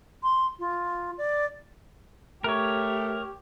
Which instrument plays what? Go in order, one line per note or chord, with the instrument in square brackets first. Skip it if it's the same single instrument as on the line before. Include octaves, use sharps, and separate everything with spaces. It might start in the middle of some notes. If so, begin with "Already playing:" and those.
[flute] C6
F4
D5
[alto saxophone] A3 [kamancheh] G4 [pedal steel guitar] A#4 C#5